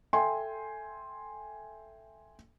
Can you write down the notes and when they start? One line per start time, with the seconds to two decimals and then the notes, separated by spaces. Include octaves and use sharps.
0.13 A4 E5 G5 G#5 C6